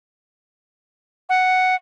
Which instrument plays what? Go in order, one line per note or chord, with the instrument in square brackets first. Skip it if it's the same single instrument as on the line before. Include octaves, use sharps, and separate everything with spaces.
[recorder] F#5